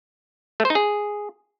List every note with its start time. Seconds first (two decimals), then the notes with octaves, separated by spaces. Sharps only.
0.60 A3
0.65 C5
0.70 D#4
0.75 G#4